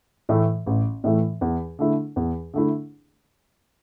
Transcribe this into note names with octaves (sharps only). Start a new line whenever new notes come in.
A2 E3 A3
A1
A2 E3 A3
E2
D3 A3 E4
E2
D3 A3 E4